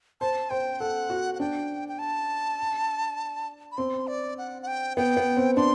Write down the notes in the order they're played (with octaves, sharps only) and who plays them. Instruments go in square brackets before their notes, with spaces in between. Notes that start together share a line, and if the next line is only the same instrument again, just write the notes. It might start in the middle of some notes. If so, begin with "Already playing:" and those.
[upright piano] C5 [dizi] A5
[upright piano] C5 [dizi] G5
[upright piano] A4 [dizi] F#5
[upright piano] F#4
[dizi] F#5
[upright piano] D4 [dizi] G5
[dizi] G5
A5
B5
[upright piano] C4 [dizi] C6
[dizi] D5
F#5
F#5
G5
[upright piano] B3 [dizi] G5
[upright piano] B3
C4
[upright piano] D4 [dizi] C6